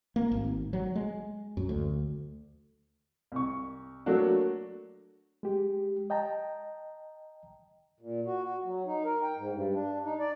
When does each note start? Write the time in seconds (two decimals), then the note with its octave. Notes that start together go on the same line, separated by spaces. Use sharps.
0.16 A#3
0.31 G#1
0.73 F#3
0.95 G#3
1.57 F#2
1.69 D2
3.32 C2 C#6
4.06 F#3 A3 A#3 D4 F#4
5.43 G#3 G4
6.10 D#5 G5 A5 A#5
8.00 A#2
8.26 F#4
8.43 F#4
8.65 F#3
8.86 D#4
9.05 A#4
9.23 G5
9.36 G#2
9.53 G2
9.74 D4
10.05 D#4
10.19 D5